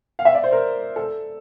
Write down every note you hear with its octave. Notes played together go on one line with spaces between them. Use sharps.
F5
E5
D5
C5
A#4
A4